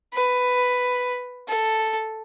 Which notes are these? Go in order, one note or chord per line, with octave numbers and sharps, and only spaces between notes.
B4
A4